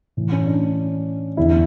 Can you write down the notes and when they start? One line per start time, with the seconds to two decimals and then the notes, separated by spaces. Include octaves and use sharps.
0.17 A2 E3
0.32 C#4
0.47 D4
1.37 E2 D3 E4